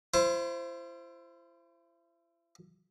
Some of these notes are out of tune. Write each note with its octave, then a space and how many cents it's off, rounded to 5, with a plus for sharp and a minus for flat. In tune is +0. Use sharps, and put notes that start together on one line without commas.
E4 +40 C5 +0